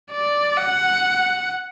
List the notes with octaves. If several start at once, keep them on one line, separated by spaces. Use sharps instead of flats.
D5
F#5